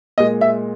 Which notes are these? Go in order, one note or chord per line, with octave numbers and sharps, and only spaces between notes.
A#2 G#3 D#5
E5